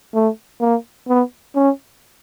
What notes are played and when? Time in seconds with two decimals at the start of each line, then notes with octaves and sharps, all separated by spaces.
0.14 A3
0.61 A#3
1.08 B3
1.55 C#4